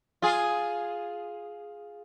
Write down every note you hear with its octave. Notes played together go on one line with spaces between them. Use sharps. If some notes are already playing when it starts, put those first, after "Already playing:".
F4 G#4